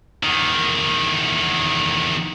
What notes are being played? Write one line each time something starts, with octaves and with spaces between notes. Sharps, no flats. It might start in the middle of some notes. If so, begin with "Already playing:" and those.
E2 D#3